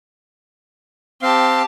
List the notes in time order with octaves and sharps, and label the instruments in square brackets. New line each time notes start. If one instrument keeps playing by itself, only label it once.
[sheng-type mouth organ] C4 F5 [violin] G4 A5